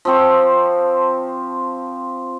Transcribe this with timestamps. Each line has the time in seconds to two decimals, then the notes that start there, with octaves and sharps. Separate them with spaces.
0.05 F3 C4 C#6